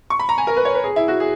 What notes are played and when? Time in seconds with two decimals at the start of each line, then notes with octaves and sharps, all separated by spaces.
0.10 C#6
0.20 B5
0.29 A#5
0.38 G#5
0.47 A#4
0.57 B4
0.65 C#5
0.75 B4
0.84 G#4
0.96 E4
1.08 F#4
1.20 G#4